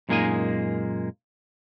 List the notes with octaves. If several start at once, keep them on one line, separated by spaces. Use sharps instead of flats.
F#2 A#2 G#3 A#3 D#4 G#5